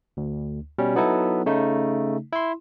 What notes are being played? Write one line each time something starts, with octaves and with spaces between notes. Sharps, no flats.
D2
B2 G3 C#4
F#3 B3 D#4 E4 A4
C#3 A3 D#4
E4 C6